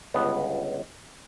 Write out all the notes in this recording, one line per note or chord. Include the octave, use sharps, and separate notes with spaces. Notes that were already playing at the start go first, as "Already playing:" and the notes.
G1 C#2 B3